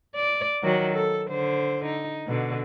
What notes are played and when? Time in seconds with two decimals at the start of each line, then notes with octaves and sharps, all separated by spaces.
0.16 D5
0.63 D#3 F#3 F#4
0.94 A4
1.30 D3 C5
1.86 D#4
2.27 B2 D3